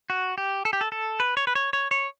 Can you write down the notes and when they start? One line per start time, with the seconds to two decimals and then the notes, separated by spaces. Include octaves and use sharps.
0.10 F#4
0.38 G4
0.65 A4
0.73 G4
0.81 A4
0.92 A4
1.20 B4
1.37 C#5
1.47 B4
1.55 C#5
1.73 C#5
1.91 C#5